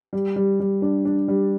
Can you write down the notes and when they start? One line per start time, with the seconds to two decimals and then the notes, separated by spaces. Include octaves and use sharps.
0.13 G3
0.36 G3
0.60 G3
0.82 D4
1.05 D4
1.28 G3